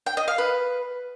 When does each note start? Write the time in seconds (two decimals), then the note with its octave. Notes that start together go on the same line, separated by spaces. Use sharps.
0.06 G5
0.17 D#5
0.28 F5
0.38 B4